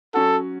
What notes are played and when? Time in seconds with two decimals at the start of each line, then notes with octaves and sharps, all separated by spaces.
0.14 F#3 C#4 F#4 A4